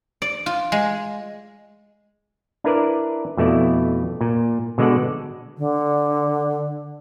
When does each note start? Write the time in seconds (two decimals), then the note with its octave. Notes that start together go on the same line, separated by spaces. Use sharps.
0.22 D5
0.46 F4
0.72 G#3
2.64 D4 E4 A#4 B4 D5
3.37 F2 B2 A3 E4 D5
4.21 A#2
4.78 B2 D3 G#3 A4 D5 F#5
5.58 D3